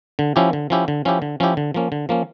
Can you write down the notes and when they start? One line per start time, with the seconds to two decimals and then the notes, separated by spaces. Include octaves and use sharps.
0.19 D3
0.36 F3 C#4 E4 G4
0.53 D3
0.70 F3 C#4 E4 G4
0.88 D3
1.05 F3 C#4 E4 G4
1.22 D3
1.40 F3 C#4 E4 G4
1.57 D3
1.74 F3 A#3 C#4
1.92 D3
2.09 F3 A#3 C#4